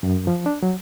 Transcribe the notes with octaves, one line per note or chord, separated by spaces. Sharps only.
F#2
F3
D4
F#3